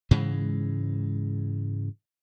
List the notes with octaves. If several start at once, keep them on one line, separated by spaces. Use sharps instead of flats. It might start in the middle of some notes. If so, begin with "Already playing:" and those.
G#2 C#3 E3 G#3